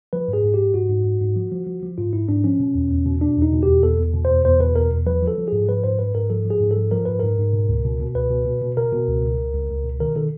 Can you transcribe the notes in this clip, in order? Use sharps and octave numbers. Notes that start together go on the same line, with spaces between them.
F3 B4
G#2
G#4
G#2
G#2 G4
G#2 F#4
G#2
G#2
G#2
F3
F3
F3
F3
G#2 F4
G#2 E4
G#2 D4
F3 C#4
B2
E2
E2
B2
B2 D4
E2
D#4
B2
E2 G4
E2 A4
E2
B2
C5
E2
E2 C5
B2 B4
E2 A#4
E2
F3 B4
F3
A4
F3
G#2 G#4
F3 B4
G#2 C5
G#2 B4
G#2 A#4
F3 A4
F3
G#4
G#2
A4
F3
F3 A#4
G#2 B4
G#2 A#4
G#2
B2
C#2
B2
B2
C#2 B4
B2
B2
B2
B2 A#4
B2
C#2
C#2
C#2
C#2
C#2
B2
D#3 A#4
D#3 A4